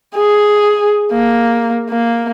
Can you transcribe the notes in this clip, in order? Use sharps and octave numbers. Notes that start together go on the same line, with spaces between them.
G#4
A#3
A#3